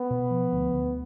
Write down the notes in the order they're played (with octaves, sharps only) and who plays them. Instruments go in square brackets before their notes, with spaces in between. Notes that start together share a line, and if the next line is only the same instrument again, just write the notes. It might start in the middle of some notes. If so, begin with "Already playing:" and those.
Already playing: [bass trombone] B3
[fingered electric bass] B2
F3
D2
D2